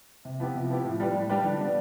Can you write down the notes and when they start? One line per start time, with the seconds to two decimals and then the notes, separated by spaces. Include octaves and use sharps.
0.25 C3
0.40 F3 B3 E4 G4
0.55 C3
0.70 F3 B3 E4 G4
0.84 A2
1.00 G3 D4 G4 B4
1.15 A2
1.29 G3 D4 G4 B4
1.44 D3
1.59 F3 B3 D4